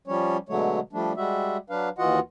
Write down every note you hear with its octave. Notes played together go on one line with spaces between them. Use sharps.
F3 G3 C#4 C#5
B2 D3 F#3 G#3 A3 C#5
F3 G3 A3 D4
G3 G#3 F#4 E5
F#3 D4 B4 F5
D#2 E3 F4 F#4 D#5 F#5